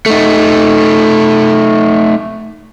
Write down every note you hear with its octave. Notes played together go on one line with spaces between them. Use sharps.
A3 D#4